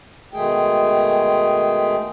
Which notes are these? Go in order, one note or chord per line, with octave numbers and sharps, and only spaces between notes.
B2 D#3 G#3 A3 G#4 G5